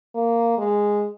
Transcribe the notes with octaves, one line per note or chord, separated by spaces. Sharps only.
A#3
G#3